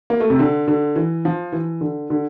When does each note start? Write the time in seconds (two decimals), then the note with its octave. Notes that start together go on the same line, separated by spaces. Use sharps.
0.10 A#3
0.20 A3
0.30 C3
0.39 D3
0.68 D3
0.96 E3
1.25 F3
1.52 E3
1.81 D3
2.10 D3